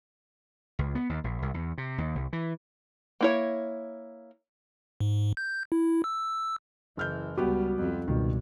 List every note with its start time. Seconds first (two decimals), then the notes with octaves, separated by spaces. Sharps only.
0.79 C#2
0.95 B3
1.09 D#2
1.24 A#1
1.42 C2
1.54 E2
1.78 C3
1.98 D#2
2.15 C2
2.33 E3
3.21 A#3 E4 C#5
5.00 G#2
5.37 G6
5.72 E4
6.04 E6
6.97 F#1 E3 F6 G6
7.38 C#2 G3 B3 F#4 G4
7.78 F2
8.08 C#2 G2 B2 D#3